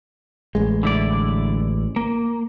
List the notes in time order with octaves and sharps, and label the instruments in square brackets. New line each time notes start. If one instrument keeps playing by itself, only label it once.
[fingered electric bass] A1 G#3
[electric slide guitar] D3 E4 D5
A#3